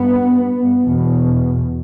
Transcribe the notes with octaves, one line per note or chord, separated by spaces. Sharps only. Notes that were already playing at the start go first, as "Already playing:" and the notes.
Already playing: G2 B3
E2 B2